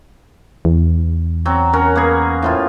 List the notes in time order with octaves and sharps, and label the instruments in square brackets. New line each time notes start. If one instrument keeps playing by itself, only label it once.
[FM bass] E2
[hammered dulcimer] F#3 C4
C#4 F#4 A#4
A#3 B3 G#4
A2 F3 F4